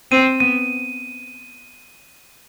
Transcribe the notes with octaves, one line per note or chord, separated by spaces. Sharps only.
C4 D#7
B3 D#7